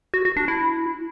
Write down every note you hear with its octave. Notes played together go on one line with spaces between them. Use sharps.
F#4
F#4
D4
E4